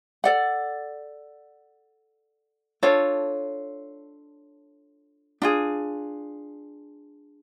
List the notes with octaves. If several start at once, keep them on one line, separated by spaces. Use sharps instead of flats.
A4 D5 F#5
D4 F4 A4 C#5
D4 F4 G#4